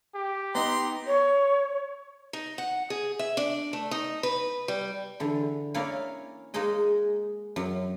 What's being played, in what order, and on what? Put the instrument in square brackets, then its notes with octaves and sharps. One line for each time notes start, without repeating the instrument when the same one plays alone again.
[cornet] G4
[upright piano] B3 D#4 [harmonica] A#5 C6
[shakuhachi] C#5
[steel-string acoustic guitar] D#4
F#5
G#4
E5
D4
A3
D#4
B4
G3
[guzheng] D3 E3
A#3 C#4 E4 C#5 D5 F5
G#3 A#3 D#4 G#4 D#5
F#2